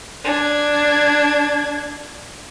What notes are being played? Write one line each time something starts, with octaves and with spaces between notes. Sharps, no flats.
D4 G#6